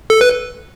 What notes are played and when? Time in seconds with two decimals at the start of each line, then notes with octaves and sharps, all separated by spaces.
0.10 A4
0.21 B4